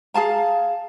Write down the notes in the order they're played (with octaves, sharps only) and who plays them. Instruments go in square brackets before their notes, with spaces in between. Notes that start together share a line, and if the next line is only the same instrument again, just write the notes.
[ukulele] G#4 F5 A5 A#5